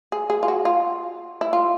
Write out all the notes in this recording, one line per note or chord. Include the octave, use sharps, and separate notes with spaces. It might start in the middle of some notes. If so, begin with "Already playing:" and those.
G#4
G#4
F4
F#4
F4
E4
F4